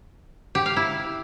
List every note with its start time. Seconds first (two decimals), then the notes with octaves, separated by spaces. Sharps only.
0.55 G4
0.66 F5
0.77 E4